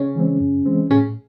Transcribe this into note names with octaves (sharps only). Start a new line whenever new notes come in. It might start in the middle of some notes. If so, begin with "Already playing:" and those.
Already playing: C#3 C#4
E3 G#3 C4
F#2
E3 G#3 C4
A2 C#3 C#4